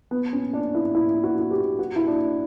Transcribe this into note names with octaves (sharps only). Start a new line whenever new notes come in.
B3
C#4
D4
E4
E4
F#4
F#4
G4
F#4
E4
D4